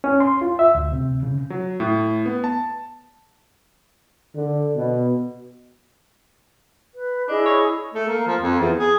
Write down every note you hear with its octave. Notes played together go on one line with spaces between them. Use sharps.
C#4
C6
F4
E5
D2
C3
C#3
F#3
A2
B3
A5
D3
B2
B4
D4 E4 G#4 D#5
C#5
A3
A#3
F3
F2
E2
G#4